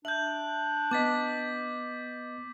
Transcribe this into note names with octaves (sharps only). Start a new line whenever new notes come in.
D4 E5 G6 F#7
B3 D#5 D6 A6 B6